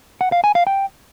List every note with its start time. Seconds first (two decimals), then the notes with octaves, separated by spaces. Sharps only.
0.21 F#5
0.32 F5
0.44 G#5
0.55 F5
0.67 G5